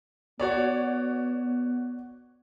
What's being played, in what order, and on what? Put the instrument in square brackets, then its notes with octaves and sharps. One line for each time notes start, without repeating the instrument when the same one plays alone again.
[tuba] B3 [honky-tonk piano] F#4 C#5 D5